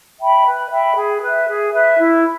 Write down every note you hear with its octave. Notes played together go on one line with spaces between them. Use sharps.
E5 G5 B5
B4
E5 G5 B5
G#4
B4 E5
G#4
B4 E5
E4